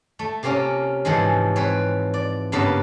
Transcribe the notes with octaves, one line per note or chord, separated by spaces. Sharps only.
A3
C3 A#3 C4 C#4 F4
G#2 E3 F3 G#3
C4 B4 C#5
D5
G2 C#3 A#3 B3 B4 A5